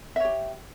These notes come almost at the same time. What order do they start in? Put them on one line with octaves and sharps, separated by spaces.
E5 C#5 G4